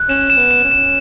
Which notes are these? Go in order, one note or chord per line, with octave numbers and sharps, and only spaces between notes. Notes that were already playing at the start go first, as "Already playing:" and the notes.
Already playing: F#6
C#4 E7
E7
B3
E7
C#4
E7